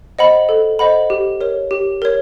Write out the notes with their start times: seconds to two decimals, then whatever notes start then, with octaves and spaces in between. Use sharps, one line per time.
0.19 C5 D#5 F#5 B5
0.49 A4
0.79 C5 D#5 F#5 B5
1.10 G4
1.41 A#4 C#5
1.71 G4
2.02 A#4 C#5